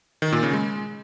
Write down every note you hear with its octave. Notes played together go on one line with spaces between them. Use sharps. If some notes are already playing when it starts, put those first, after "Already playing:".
D#3
A#2
C#3
G#3